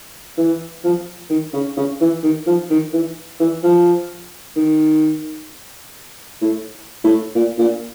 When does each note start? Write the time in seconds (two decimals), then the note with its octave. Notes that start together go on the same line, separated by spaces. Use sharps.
0.37 E3
0.84 F3
1.30 D#3
1.53 C#3
1.77 C#3
2.00 E3
2.23 D#3
2.46 F3
2.70 D#3
2.93 E3
3.40 E3
3.63 F3
4.56 D#3
6.41 A2
7.04 A2
7.35 A#2
7.58 A#2